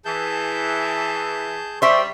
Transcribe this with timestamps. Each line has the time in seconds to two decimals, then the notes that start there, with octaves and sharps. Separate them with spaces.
0.05 E3 G#4 A5 G6
1.82 G3 C5 E5 C#6